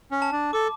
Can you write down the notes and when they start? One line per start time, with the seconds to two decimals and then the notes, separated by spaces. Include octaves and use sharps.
0.11 C#4
0.22 A5
0.32 D4
0.53 A4 D6